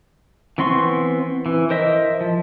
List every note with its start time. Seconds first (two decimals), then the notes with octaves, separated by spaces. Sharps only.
0.58 E3 B3 C4 C6 C#6
1.46 E3
1.70 A#4 C5 D#5 E5
2.21 F3